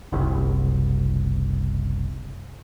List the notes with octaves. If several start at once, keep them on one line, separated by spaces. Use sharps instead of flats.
F#1 C2